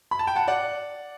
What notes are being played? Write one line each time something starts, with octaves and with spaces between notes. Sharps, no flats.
B5
A5
G5
F#5 A5
D5 F#5